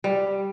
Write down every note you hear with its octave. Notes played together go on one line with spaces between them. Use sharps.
G3